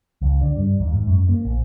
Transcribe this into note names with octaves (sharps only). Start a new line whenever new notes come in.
C#2
D3
G2
D#2
G#2
F#2
A#3
A#1